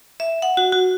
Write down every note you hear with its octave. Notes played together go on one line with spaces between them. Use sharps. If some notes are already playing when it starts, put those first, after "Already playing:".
E5
F#5
F#4
F#4